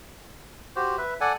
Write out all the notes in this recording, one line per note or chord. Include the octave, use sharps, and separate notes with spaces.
F#4 G4 C5
B4 E5
A4 D5 F#5 G#5